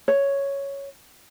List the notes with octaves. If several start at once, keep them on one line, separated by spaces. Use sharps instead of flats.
C#5